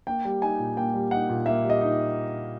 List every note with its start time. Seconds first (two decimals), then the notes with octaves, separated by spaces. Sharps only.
0.07 A#3 G5
0.25 G3
0.42 D#4 G#5
0.59 A#2
0.77 A#3 G5
0.94 G3
1.11 D#4 F#5
1.30 A#2
1.46 A#3 E5
1.64 G3
1.70 D#5
1.81 D#4